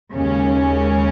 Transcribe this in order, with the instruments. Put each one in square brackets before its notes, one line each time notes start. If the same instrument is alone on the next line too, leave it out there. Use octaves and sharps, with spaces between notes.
[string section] D#2 C#3 G#3 C#4